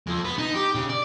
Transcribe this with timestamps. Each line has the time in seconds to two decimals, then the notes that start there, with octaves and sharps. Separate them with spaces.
0.07 F2
0.25 B3
0.38 D#4
0.54 G4
0.75 C#3
0.90 D5